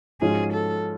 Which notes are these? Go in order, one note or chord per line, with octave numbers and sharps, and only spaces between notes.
G#2 F3 G#3 C#4 F#4 G#4
A4